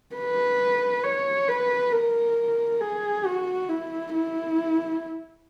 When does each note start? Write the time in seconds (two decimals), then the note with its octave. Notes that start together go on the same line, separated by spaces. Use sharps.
0.16 B4
1.04 C#5
1.48 B4
1.92 A#4
2.81 G#4
3.26 F#4
3.69 E4
4.14 E4